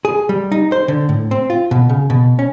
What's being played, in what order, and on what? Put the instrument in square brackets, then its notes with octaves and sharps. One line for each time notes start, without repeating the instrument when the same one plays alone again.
[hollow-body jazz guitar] G#4
G3
D#4
C5
D3
A2
C4
F4
B2
C#3
B2
C#4